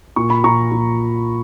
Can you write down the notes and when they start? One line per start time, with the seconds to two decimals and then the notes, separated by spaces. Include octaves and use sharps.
0.16 A#2 C#6
0.30 B5
0.44 A#2 A#5 C#6
0.71 A#2